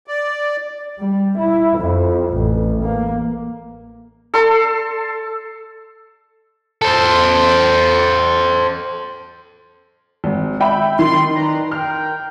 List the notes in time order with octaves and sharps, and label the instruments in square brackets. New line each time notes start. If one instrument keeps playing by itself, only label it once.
[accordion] D5
[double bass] G3
E4
F2
A1
A#3
[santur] A4 C6
[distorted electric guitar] A4 C5
[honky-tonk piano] G#1
E5 G5 B5
[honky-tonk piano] D#3 [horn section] C6
[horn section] B4 D5 A#5
[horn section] A#4 G5 [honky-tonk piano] F6